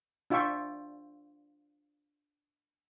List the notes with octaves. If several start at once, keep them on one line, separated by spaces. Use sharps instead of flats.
D4 F4 E5 G5 C#6